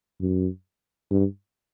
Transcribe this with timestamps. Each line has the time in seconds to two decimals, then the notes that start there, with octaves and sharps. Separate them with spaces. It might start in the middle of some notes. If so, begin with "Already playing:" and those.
0.21 F#2
1.11 G2